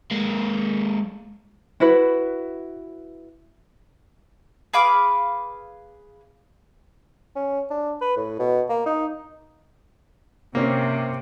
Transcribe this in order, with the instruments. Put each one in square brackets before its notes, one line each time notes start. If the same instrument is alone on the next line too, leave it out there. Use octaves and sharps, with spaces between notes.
[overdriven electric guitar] G#3 A#3
[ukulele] E4 F#4 B4
[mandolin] G#4 B4 F5 D6
[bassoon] C#4
D4
B4
A2
B2
A#3
D#4
[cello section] C3 [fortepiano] A#3 C4 C#4